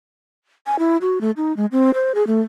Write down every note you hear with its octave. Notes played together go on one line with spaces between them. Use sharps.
G#5
E4
F#4
A3
D#4
G#3
C4
C5
G#4
A3